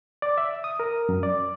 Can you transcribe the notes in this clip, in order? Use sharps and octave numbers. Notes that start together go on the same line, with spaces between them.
D5
E5
D#6
A#4
F#2
D5